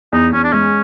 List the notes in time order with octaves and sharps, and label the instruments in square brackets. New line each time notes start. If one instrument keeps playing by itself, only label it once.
[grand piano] E2 [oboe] D#4
[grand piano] E2 [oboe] C#4
[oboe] D4
[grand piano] G#3 [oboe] C#4